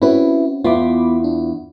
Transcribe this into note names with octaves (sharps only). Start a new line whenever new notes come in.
C4 C#4 E4 F#4 B4
E2 B3 F4 B5 D6
D4